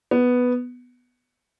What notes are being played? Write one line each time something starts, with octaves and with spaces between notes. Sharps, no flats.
B3